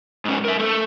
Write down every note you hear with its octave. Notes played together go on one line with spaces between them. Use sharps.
G#2 C#4
A#4 E5
A3 A4